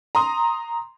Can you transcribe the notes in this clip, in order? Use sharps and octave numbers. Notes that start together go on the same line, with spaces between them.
A#5 C6 D#6